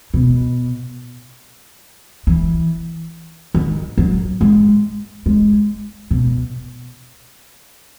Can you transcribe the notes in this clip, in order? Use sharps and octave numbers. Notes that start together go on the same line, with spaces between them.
B2
E3
D#3
F#3
G#3
G#3
B2